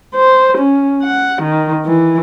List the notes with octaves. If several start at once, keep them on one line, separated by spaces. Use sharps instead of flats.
C5
C#4
F#5
D#3
E3